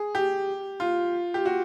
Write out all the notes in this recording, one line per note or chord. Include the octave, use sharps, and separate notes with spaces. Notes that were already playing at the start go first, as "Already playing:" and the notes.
Already playing: G#4
G4
F4
G4
F#4